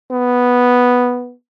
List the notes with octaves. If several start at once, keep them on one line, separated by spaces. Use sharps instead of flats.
B3